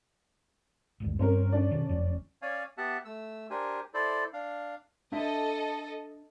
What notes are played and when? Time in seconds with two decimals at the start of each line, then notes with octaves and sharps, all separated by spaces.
1.00 G#1 D2 G2
1.19 G2 G3 C4 C#4 A#4
1.52 C#4 D4 D5
1.71 B2 D#3
1.89 F#1 F2
2.42 C#4 C#5 D5 F5 G#5
2.78 B3 G4 E5 F#5 A5
3.05 A3 E6
3.50 D4 G4 A#4 C5 G#5
3.94 E4 A4 C5 D5
4.33 D4 F5
5.12 D4 A4 D#5 E5